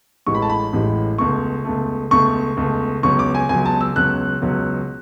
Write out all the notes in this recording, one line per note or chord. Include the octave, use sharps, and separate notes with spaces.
A1 A2 E3 G#3 C#6
B5
A5
B5
A1 A2 E3 G#3
C#2 B2 A3 C#6
C#2 B2 A3
C#2 B2 A3 C#6
C#2 B2 A3
C#2 B2 F#3 C#4 C#6
D6
G#5
C#2 B2 F#3 C#4 G#5
A5
E6
C#2 B2 F#3 C#4 F#6
C#2 B2 F#3 C#4